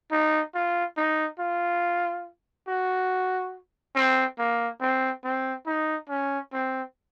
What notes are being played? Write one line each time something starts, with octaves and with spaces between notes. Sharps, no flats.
D#4
F4
D#4
F4
F#4
C4
A#3
C4
C4
D#4
C#4
C4